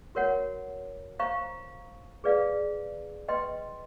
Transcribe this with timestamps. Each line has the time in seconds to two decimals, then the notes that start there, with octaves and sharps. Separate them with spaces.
0.15 F#4 A#4 C#5 F#5
1.19 C5 F5 A#5 C#6
2.24 G#4 B4 D5 F5
3.28 B4 D#5 G5 C6